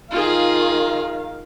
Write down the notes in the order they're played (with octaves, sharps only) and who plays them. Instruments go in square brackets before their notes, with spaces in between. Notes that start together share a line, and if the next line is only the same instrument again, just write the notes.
[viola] D#3 F5 [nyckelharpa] F4 G#4